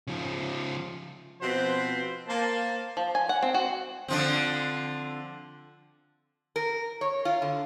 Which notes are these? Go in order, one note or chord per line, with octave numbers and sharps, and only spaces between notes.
C#3 F3
B2 F3 C4 B4 C5
A#3 C5 A5
F3
G#5
F#5
C4
F#4
D3 F3 C4
A#4
C#5
F4
D3